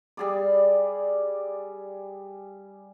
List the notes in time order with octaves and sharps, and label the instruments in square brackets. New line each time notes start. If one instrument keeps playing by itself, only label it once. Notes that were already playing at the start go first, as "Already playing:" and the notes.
[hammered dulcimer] G3 G#4 D5